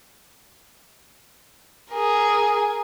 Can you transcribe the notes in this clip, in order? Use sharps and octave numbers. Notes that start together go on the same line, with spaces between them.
G#4 A#4